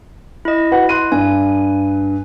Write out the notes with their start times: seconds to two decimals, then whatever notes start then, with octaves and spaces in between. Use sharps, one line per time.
0.45 E4 D#5
0.71 F#4 B4 F#5
0.89 C6 F#6 D#7
1.12 G2 G#5